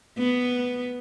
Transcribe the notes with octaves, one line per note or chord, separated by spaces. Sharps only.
B3